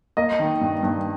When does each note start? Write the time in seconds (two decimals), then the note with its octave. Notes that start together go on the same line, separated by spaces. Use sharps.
0.17 A#3 D#5
0.40 D#3
0.61 G2
0.83 G2